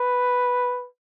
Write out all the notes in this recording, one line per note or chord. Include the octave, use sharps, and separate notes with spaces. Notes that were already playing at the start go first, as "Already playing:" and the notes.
Already playing: B4